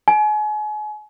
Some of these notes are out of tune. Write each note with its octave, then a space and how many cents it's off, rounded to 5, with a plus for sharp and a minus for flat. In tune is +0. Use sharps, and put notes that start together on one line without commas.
G#5 +35